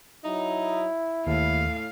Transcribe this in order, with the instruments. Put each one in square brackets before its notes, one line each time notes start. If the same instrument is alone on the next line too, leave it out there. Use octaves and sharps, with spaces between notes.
[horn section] F#3 D#4 [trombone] E4
[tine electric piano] D#2 [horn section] A2 [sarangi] F5